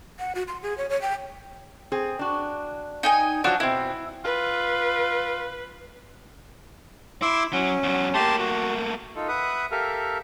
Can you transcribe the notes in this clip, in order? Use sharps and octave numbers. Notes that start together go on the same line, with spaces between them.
F#5
F#4
C6
G#4
C#5
C#5
G5
C4 G#4
D4 F#4
D#4 G5 G#5
F3 F#3 D4 F#4 F6
B2 C4 E4
F4 B4
E4 C6 D6 E6
F#3 C#4
E2 F#3
A3 A#3 G4 A5 C6
F#4
D#4 F4 A4
B4 E5 F#5 D#6
G4 A4 A#4 E5 F5